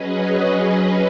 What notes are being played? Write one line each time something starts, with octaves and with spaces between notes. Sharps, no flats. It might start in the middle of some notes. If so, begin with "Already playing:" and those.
Already playing: F#3 C#4 G#4 B4 D#5